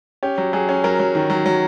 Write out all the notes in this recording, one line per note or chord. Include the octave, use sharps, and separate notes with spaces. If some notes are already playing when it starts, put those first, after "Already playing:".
C#4 G4
F#3
F#3 G#4
C#4
F#3 A#4
F#3
D#3
F#3
F#3